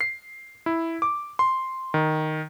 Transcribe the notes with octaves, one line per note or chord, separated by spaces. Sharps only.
C7
E4
D6
C6
D#3